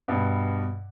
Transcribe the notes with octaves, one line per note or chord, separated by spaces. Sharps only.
G2 B2